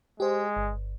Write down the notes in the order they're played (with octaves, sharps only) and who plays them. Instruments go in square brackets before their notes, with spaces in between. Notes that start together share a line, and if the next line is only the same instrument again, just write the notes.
[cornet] G#3 [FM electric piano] G4 C5
[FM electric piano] G1